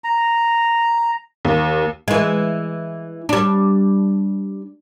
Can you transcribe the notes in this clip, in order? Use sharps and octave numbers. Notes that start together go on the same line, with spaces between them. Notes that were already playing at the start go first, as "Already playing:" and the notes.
A#5
D#2
E3 G#3
G3 D4